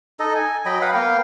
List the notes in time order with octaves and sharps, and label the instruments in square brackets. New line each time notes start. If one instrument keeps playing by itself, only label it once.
[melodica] D#4 A4 D#5
G#5
F#3 D#5 G5 B5
B4 F5 F#5 B5
A#3 B3 F5 G5